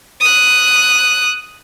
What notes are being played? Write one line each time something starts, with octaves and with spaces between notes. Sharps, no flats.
D#6 F#6